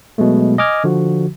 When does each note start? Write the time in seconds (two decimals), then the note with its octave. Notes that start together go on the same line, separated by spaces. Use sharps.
0.18 B2 F#3 G#3 A3
0.58 D#5 G#5 D6 F6 G#6
0.84 D3 F3 F#4